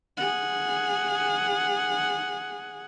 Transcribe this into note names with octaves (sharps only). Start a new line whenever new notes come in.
G#4 F#5